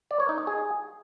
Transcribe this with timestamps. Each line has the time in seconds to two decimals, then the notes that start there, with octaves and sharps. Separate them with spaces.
0.11 D5
0.20 C#5
0.29 D#4
0.38 D#5
0.47 G#4